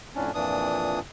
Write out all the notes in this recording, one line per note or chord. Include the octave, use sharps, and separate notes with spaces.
F2 A2 C#4 D4
F2 A#2 E3 D4 D#6